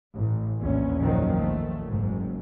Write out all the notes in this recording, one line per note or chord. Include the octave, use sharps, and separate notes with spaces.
A1
A#1 E2 C#4
F#2 A#2 D#3 F3 F#3
A#1 A3
F#1 G#2